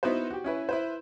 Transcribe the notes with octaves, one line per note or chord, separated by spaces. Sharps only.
B3 D#4 E4 F#4 B4 C5
F#4 G4
C#4 E4 B4
E4 B4 C5